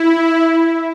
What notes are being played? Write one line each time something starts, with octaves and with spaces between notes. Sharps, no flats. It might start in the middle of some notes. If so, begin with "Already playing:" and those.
Already playing: E4